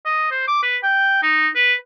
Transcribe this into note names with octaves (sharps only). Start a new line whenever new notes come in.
D#5
C5
D6
B4
G5
D#4
B4